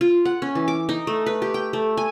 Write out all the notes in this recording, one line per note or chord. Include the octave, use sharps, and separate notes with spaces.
F4
F#5
C#4
E3
D6
D#4
A3
B4
G4
G5
A3
G#5